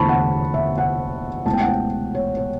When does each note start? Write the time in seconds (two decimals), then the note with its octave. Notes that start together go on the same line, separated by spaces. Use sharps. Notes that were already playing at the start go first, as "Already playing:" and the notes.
Already playing: E2 D3 A3 E4 A5 B5 C#6
0.09 F#5
0.54 E5
0.78 F#5
1.46 C#2 B2 A3 E4 A5
1.53 G5
1.61 F#5
1.68 G5
2.15 C#5
2.37 C#5